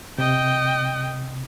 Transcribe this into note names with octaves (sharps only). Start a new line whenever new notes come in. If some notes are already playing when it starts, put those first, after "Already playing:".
C3 D#5 G5